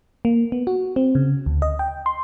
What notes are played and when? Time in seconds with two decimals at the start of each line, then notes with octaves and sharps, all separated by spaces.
0.25 A#3
0.52 B3
0.67 F#4
0.96 C4
1.15 C#3
1.46 D2
1.62 D#5
1.79 G5
2.06 C6